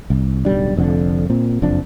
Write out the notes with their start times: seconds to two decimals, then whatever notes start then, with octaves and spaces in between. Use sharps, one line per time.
0.10 C2
0.45 D1 B1 G3 D4
0.76 F1 F2 A#2 D3
1.30 A#2 C4
1.62 F#1 F2 F3 D4